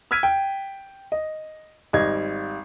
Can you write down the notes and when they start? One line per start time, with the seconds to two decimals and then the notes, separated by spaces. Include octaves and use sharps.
0.11 E6 F6 G#6 B6 D#7
0.23 G5
1.12 D#5
1.93 G#1 G3 D#5 G#6